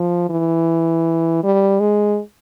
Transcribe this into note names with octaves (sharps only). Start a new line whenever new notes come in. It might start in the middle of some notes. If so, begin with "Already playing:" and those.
Already playing: F3
E3
G3
G#3